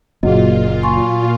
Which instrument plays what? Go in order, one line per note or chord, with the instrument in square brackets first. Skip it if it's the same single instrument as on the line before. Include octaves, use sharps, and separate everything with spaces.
[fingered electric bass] F#1 [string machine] A#2 F4 [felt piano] F#3 [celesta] G#4 D#5
[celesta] G#5 C6 C#6